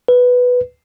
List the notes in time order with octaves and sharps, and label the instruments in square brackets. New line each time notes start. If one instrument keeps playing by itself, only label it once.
[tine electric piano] B4